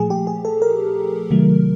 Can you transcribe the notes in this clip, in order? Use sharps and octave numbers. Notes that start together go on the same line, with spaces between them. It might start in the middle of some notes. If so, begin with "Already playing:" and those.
Already playing: A#2 F3 A3 G#4
G4
G#4
A4
A#4
C3 D#3 F#3 A3